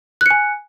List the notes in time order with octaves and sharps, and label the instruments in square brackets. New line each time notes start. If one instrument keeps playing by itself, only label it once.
[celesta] F#6
C#7
G#5